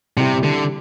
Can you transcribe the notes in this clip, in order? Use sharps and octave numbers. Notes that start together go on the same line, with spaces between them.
C3 G3 C4 E4 G4
D3